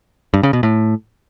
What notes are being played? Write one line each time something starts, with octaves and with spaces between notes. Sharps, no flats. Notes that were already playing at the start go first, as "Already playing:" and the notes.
G2
C#3
B2
A2